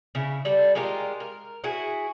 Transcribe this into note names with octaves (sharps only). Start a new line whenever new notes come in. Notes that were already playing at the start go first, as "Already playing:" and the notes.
C#3 E4
G3 A4 D5
G#3 F4 G4 A#4
A#4
E4 F#4 G#4